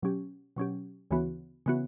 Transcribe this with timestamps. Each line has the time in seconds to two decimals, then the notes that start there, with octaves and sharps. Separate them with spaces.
0.02 B2 F#3 C#4 G4
0.56 B2 F#3 C#4 G4
1.11 D2 C#3 E3 B3 F#4
1.66 C#3 E3 B3 F#4